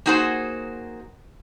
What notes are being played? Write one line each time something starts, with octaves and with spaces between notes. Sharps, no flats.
A#3 D#4 F#4 G#4 C5